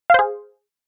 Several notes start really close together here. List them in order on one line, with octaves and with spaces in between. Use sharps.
F5 C5 G#4